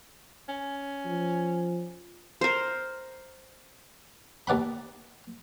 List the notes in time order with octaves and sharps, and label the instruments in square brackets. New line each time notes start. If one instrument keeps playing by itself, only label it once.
[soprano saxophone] C#4
[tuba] F3
[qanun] A#4 C5
[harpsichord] D#2 D5 F#5 B5